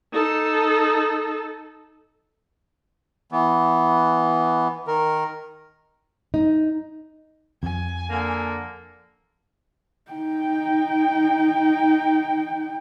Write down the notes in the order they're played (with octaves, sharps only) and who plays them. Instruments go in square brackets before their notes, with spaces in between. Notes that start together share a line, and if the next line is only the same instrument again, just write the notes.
[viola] D#4 A4
[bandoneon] E3 B3
D#3 A#4
[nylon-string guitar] D#4
[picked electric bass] F2 [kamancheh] G#5
[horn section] D3 A#3
[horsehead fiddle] D#4 G5